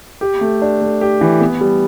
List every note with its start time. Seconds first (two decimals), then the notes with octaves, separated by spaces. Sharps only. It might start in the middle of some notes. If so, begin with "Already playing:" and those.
0.21 G4
0.41 A3
0.62 D4
0.81 A3
1.01 G4
1.21 E3
1.41 B3
1.61 G3